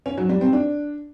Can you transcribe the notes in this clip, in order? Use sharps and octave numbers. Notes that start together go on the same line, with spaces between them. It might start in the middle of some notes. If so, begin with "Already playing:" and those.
C#4
F#3
G3
C4
D4